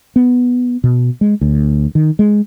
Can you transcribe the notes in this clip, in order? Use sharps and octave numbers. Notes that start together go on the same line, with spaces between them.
B3
B2
G#3
D2
D#3
G#3